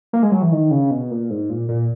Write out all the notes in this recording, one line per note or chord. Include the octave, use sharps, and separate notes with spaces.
A#3
G#3
F#3
E3
D#3
C#3
B2
A#2
G#2
A#2
A#2